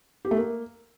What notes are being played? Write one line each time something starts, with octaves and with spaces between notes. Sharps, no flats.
G4
A3
A#3